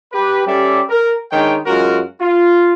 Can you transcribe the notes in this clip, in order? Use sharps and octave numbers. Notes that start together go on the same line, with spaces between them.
G4 B4
G3 C#4 G4 A4 D5 E5
A#4
D#3 G#3 D4 C#5 G5
F#2 G#3 F4 F#4 A#4
F4